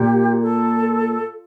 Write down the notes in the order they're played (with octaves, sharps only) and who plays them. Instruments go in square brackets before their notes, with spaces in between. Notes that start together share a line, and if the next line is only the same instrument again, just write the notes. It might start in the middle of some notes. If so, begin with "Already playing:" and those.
Already playing: [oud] A#2 [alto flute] G4
[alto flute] A4